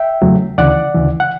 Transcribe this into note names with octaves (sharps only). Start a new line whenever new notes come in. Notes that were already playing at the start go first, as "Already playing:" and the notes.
Already playing: E5 G5
E2 C#3 F#3 A3
D2 C#3 E3 D5 F#5
D2 C#3 E3
F#5